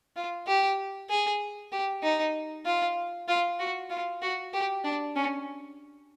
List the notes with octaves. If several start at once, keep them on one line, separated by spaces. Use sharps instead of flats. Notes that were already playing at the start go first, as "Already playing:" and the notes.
F4
G4
G#4
G4
D#4
F4
F4
F#4
F4
F#4
G4
D4
C#4